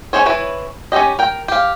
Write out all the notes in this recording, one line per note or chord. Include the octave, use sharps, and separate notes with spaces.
C#4 D#4 G#4 C5 C#5
E3 E4 B4 C#5
C#4 D#4 E4 G4 D#5
A#4 G5
G4 F5